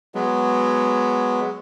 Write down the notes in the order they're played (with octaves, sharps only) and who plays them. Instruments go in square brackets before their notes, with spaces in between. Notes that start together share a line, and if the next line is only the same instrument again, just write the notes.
[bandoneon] F#3 G#3 B3